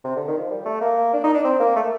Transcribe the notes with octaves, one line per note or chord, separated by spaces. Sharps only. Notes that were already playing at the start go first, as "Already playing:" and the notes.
C3
D3
D#3
F3
G3
A3
A#3
D4
D#4
D4
C4
A#3
A3